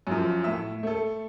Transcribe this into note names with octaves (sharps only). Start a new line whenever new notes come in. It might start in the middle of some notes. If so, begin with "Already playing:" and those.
F#2 F3
A2 E5
A3 A4